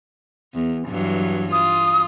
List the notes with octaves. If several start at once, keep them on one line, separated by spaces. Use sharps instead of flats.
E2
G2 E3 F#3
F4 D#6